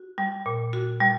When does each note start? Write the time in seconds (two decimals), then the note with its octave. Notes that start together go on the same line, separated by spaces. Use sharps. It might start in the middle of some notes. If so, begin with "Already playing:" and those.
Already playing: F#4
0.18 G3
0.46 A#2
0.73 F#4
1.01 G3